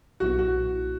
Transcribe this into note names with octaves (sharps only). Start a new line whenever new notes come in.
B1 A#2 F#3 B3 E4 F#4
F#4